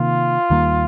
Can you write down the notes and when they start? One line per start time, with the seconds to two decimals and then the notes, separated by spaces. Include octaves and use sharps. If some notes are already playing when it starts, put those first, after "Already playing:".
Already playing: C3 D#3 A#3 F4
0.50 D#2 D#3 G3 A#3